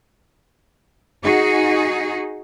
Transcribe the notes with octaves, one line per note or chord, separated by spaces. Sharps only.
D#4 F#4 G#4